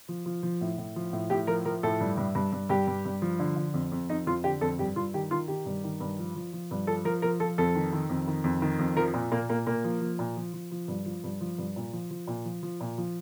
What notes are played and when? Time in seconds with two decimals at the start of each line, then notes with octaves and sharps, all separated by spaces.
0.08 F3
0.26 F3
0.43 F3
0.61 A2
0.78 A2
0.96 F3
1.13 A2
1.30 A2 G4
1.47 F3 A#4
1.65 F3 A#4
1.83 A2 A4
2.01 G2
2.17 G2
2.35 G2
2.52 G2
2.69 G2 G4
2.87 G2
3.05 G2
3.22 F3
3.39 D3
3.56 D3
3.74 F2
3.92 F2
4.09 F2 D#4
4.27 F2 F4
4.44 D3 G4
4.61 F2 A4
4.79 G2 G4
4.96 G2 F4
5.14 D#3 G4
5.31 D#3 F4
5.48 D#3 G4
5.66 G2
5.84 D#3
6.00 G2
6.19 F3
6.36 F3
6.53 F3
6.71 G2
6.87 F3 A4
7.05 F3 A#4
7.22 F3 A#4
7.40 F3 A4
7.58 F2 A4
7.75 D#3
7.93 D#3
8.10 F2
8.27 D#3
8.44 F2
8.62 D#3
8.79 F2
8.97 F3 A#4
9.14 A#2
9.32 A#2 A#3
9.49 A#2 A#3
9.66 A#2 A#3
9.84 F3
10.01 F3
10.19 A#2
10.37 F3
10.54 F3
10.71 F3
10.88 G2
11.06 F3
11.24 G2
11.41 F3
11.58 G2
11.76 A#2
11.93 F3
12.11 F3
12.27 A#2
12.45 F3
12.63 F3
12.81 A#2
12.98 F3